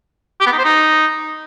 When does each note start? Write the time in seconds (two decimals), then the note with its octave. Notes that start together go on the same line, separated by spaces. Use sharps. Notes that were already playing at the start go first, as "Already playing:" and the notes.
0.41 G4
0.47 B3
0.53 D#4
0.59 C5
0.65 D#4